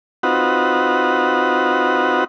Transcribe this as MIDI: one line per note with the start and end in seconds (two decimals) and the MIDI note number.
0.23 2.24 60
0.23 2.24 63
0.23 2.24 65
0.23 2.24 66
0.23 2.24 71
0.23 2.24 78